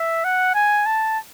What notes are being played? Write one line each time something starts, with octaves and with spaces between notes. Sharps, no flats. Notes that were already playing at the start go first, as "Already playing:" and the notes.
Already playing: E5
F#5
G#5
A5